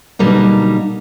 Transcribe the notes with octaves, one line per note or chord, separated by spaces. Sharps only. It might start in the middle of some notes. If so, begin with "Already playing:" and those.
B2 D3 F#3 G3 A#3 D#4